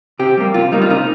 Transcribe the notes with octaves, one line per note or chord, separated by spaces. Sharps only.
C3 G4
G3 A#3
C3 F4
G3 A#3 D#4
F4
C3 D#4